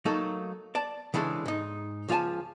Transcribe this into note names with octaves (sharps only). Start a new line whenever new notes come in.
F#3 A3 A#3 D#4 A4
D5 A5
C#3 E3 G#3 A3 D4
G#2 D#4
C#2 F3 F4 A4 G#5 A5